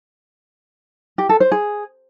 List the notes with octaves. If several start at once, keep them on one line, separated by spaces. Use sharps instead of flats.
G4
A4
C5
G#4